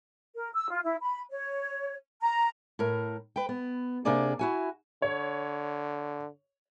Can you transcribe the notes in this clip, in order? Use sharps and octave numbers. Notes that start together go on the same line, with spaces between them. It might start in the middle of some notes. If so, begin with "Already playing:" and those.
A#4
E6
F4
E4
B5
C#5
A#5
A2 A#4
B4 G5
B3
C3 A#3 D4 G#4 D5 G#5
E4 F#4 G#5
D3 C#5